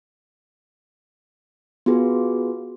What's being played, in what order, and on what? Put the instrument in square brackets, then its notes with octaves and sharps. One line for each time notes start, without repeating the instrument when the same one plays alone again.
[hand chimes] B3 F4 F#4 G#4 B4